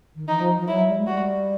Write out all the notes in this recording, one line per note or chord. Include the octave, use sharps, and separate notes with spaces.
D#3
E3 D#4
F3
F3
F#3 E4
G3
G#3
G3 F#4